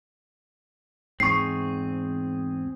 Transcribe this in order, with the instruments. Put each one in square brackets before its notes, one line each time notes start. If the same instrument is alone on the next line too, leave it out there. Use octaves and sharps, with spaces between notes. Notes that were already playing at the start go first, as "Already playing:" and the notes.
[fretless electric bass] E2 G#2 [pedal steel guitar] C4 G#4 [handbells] C#6 C7